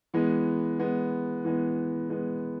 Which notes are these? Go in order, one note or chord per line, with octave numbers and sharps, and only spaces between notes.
E3 G#3 B3
E3 G#3 B3
E3 G#3 B3
E3 G#3 B3